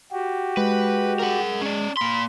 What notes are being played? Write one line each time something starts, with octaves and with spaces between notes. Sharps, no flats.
F#4 G4
G#3 B4
A#4 F#5
C#4 D5
A#3 B5 C6